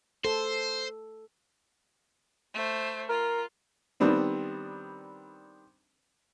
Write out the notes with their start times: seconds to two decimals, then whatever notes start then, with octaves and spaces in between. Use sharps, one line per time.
0.25 A4 C5
2.54 A3 C5
3.10 F4 A#4
4.00 D#3 G3 B3 C4 D4